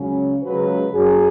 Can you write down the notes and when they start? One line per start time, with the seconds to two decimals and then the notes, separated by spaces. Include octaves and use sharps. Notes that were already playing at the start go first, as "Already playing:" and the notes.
Already playing: C#2 C#3 F#3 C#4
0.42 C#2 C#3 F#3 B4
0.92 F#2 F#3 G#4